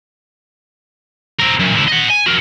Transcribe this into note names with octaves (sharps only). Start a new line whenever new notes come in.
C4 A#4
F#2 A#2
C#2 E4
D#5 F#5
G#5
F#4 A#4